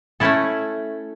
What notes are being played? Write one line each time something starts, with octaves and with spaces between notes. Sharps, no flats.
A3 C#4 E4 A4